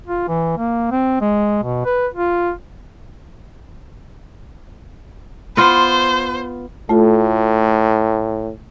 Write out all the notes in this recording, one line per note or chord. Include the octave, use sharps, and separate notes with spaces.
F4
E3
A#3
C4
G#3
B2
B4
F4
B3 F4 C5
A2 A3 F4 A4